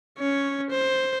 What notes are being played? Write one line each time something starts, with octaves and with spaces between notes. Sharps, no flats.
C#4 C#5
C5